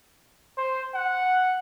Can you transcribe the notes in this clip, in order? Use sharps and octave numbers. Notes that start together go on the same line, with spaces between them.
C5
F#5